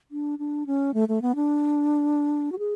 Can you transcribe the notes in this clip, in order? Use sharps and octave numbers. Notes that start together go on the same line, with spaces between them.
D4
D4
C#4
A3
A3
B3
D4
F#4
G#4